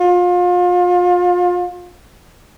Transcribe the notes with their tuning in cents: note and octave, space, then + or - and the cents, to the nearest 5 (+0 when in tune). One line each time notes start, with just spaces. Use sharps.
F4 +30